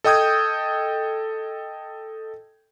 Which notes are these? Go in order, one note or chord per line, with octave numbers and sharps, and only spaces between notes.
A4 D#5 G5 D#6 G6 G#6